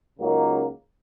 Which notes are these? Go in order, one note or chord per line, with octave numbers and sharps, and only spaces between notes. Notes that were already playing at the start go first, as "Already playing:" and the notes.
C#2 C#3 F#3 A#3 D#4